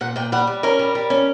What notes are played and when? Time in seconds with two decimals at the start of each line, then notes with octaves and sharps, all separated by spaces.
0.01 A#2 F#5
0.16 A#2 G5
0.32 G3 F#5
0.47 G3
0.63 C#4 A#4
0.79 G3
0.95 G3
1.10 C#4